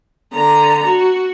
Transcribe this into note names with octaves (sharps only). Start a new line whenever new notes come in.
D3 A#5
F#4